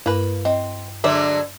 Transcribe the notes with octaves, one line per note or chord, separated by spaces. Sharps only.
G2 A#3 B4
C4 D#5
D3 F#3 G#3 C5 D5 E5